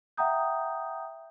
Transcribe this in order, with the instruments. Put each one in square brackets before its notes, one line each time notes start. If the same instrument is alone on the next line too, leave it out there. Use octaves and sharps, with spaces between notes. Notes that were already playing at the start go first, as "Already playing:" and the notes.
[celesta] E5 F#5 G5 A#5 D#6 G6